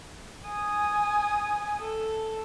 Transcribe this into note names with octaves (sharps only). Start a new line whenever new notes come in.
G#5 D#6
A4